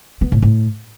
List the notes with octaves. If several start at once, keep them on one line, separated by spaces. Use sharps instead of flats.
B3
A2
A2